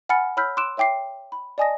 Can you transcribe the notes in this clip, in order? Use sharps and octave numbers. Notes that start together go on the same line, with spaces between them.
F#5 G#5 B5 F6 A6 C#7
C#5 B5 E6 F6 G6 B6
C6 D6 E6 F#6 D7 E7
C#5 E5 G5 D6 C7
B5
D5 D#5 G#5 A5 D#6 A#6